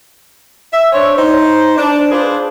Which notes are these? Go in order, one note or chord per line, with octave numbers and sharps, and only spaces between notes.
E5
D4 C5 C#5
D#4 C5
D4
D4 F4 G#4 B4 C5